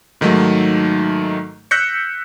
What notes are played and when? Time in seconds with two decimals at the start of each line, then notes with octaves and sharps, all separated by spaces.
0.21 G#2 D#3 F#3 A3 A#3
1.71 E6 F#6 G6 A#6 B6 C#7